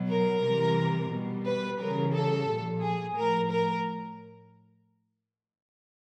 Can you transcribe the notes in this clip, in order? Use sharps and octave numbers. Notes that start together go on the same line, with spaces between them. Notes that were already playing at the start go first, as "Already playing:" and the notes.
Already playing: B2 F#3
A#4
C3 E3 G3
B2 G3
B4
C#3 E3 G3 A#4
A4
A#2 F3
G#4
A2 F3 A#4
A#4